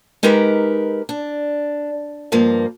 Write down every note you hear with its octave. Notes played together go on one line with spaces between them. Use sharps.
G#3 D#4 G4 A#4 B4
D4
G2 F3 A#3